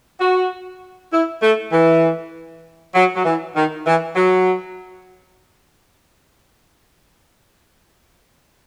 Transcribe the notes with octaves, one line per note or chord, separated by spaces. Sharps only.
F#4
E4
A3
E3
F#3
F#3
E3
D#3
E3
F#3